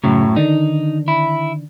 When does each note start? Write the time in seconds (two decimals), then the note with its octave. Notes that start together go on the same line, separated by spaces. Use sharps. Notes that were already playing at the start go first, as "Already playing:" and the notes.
0.04 F#2 A2 C#3 F#3
0.36 D3 D#3 D4 D#4
1.08 E4